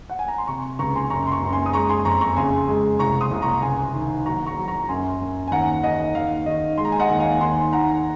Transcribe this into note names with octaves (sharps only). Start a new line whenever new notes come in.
F#5
G#5
A#5
C6
C3 A#5 C#6
C#2 A#5 C#6
G#5 C6
F#2 A#5 C#6
C6
A#5 C#6
F#2
G#5 C6
D#6
G#3 A#5 C#6
G#5 C6
F2 A#5 C#6
A#5 C#6
C#3 G#5 C6
G#3
C2 A#5 C#6
C6 D#6
C2
A#5 C#6
C#2 G#5 C6
D#3
F#3 A#5 C#6
A#5 C#6
F#3
A#5 C#6
F#2 G#5 C6
F#2
G#5
D#2 F#5 A#5
D#2 D#5 F#5
D#2 F5
D#3 D#5
G#3 C6
A#5
G#5
D#5 F#5
D#2
F5 G#5
D#2 G#5 C6
D#3 F#5 A#5